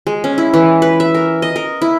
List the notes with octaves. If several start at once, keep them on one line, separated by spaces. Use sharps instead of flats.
G#3
C#4
E4
E3
B4
E5
A#4
D#5
A#4
E4